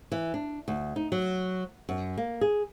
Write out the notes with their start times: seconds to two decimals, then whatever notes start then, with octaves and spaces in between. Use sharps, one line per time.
0.12 E3
0.34 D4
0.68 D2
0.96 D#4
1.12 F#3
1.89 F#2
2.18 A#3
2.41 G#4